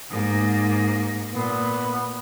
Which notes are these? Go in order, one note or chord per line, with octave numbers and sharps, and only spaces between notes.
G#2 A#3
A#2 B3